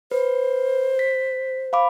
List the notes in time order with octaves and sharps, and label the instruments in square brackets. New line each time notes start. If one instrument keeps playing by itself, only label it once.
[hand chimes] B4 [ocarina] C5
[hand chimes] B6
F5 B5 D6